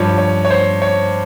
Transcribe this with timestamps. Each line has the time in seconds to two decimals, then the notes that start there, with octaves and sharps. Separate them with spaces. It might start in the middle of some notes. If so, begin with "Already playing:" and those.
Already playing: G2 F3 C#5
0.18 C#5
0.45 C#5
0.51 C5
0.82 C#5